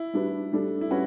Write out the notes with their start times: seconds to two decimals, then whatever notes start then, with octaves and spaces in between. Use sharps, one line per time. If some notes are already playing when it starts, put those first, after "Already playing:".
Already playing: E4
0.14 G3 D4 F#4 B4
0.53 G3 D4 A4
0.81 E4
0.91 G3 C#4 F#4 B4